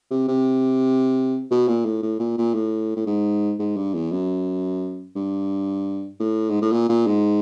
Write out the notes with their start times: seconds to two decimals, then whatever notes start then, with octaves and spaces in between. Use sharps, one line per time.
0.10 C3
0.28 C3
1.51 B2
1.68 A#2
1.85 A2
2.02 A2
2.19 A#2
2.37 A#2
2.54 A2
2.96 A2
3.06 G#2
3.59 G#2
3.76 G2
3.94 E2
4.11 F#2
5.15 G2
6.19 A2
6.50 G#2
6.61 A2
6.72 A#2
6.89 A#2
7.07 G#2